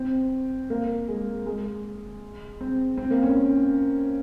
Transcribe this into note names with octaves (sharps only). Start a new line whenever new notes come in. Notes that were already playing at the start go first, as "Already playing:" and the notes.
Already playing: C4
A#3
G#3
G#3
C4
C4
A#3
C#4